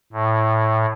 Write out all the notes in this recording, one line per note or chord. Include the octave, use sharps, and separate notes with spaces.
A2